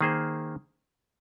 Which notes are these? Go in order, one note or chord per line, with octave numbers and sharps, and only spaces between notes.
D#3 A#3 G#4 C5